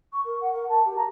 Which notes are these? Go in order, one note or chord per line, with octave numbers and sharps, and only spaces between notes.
C#6
A#4
F#5
A#4
A5
G4
A#5